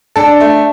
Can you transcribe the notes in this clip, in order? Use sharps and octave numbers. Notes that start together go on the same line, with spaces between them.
D4 A4
A3